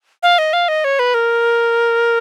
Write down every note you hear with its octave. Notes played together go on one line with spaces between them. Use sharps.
F5
D#5
F5
D#5
C#5
B4
A#4